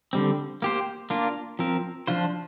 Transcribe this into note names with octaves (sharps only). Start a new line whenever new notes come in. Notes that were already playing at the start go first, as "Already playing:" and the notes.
D3 G3 C4
A#3 G4 C5
A#3 D4 F4
F3 C4 A#4
F3 D4 F4 C5